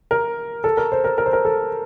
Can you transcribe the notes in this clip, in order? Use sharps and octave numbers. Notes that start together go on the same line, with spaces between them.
A#4
A4
A#4
C5
A#4
A#4
C5
A#4
A4